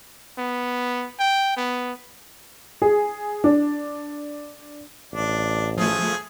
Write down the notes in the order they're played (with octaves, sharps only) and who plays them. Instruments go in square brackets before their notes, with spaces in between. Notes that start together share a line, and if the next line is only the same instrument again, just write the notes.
[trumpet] B3
G5
B3
[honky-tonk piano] G#4
D4
[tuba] A1 [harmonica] D4
[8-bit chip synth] F3 A3 [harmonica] G#4